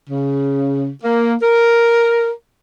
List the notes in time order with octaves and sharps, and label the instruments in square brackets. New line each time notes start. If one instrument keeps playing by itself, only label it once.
[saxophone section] C#3
A#3
A#4